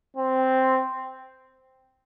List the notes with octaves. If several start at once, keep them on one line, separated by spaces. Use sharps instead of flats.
C4